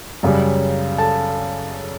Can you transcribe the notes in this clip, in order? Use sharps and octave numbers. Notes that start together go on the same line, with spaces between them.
F#2 C#3 G3
A4 A5